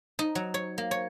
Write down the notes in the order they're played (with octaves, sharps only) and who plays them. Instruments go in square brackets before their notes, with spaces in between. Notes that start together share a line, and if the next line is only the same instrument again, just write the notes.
[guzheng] D#4
F#3
C#5
A#3
C#5